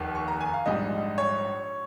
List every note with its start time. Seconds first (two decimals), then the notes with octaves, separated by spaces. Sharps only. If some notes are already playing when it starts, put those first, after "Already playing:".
Already playing: F1 D#2 D#3
0.15 C#6
0.28 A#5
0.41 G#5
0.53 F5
0.66 A#1 G#2 G3 D#5
1.18 C#5